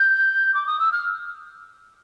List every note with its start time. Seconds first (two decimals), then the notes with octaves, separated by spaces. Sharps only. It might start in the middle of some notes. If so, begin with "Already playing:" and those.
Already playing: G6
0.54 D6
0.67 D#6
0.79 E6
0.92 F6